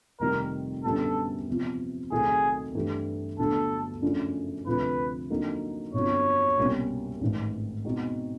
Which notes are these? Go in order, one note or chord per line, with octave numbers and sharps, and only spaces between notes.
F1 F2 C3 D#3 G3 A#4
F#2 D3 G3 B3 A4
E2 C3 F3
C2 C3 D#3 F#3 A3 G#4
G2 E3 A3 D4 G4
G1 G2 D3 F#3 A3 A4
F#2 C#3 F3 A3 D4
D2 C3 F3 B4
F2 D3 F#3 A#3 D#4
G1 F2 D3 F#3 C#5
C2 B2 G3 A#3 C#4
A1 G#2 D#3
B2 G#3 C4 D#4 F#4